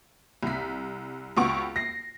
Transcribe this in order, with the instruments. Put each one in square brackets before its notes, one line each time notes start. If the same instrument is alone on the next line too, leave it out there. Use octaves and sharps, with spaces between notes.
[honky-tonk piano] C2 B6
C#2 B3 F#4 C#6 D7
A#6 C7